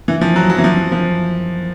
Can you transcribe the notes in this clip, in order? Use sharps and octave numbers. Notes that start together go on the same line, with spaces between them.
E3
F3
F#3
F#3
E3
F3
F3